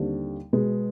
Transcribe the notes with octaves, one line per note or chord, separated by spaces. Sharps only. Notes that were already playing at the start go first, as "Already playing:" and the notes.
Already playing: D#2 D3 G3 C4
B2 G#3 B3